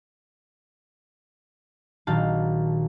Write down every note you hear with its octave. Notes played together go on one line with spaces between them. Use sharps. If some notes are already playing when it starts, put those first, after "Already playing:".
A#1 D#3 F#3 F5 A5